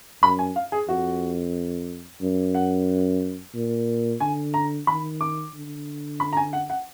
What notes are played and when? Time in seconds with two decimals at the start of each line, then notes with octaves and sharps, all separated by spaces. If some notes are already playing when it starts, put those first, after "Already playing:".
0.22 F#2 B5
0.39 G#5
0.56 F5
0.72 G#4
0.88 F2 F#4
2.22 F#2
2.54 F#5
3.55 A#2
4.20 D3 G#5
4.54 A#5
4.87 D#3 B5
5.21 D6
5.54 D3
6.20 B5
6.33 A#5
6.37 G#5
6.53 F#5
6.70 F#5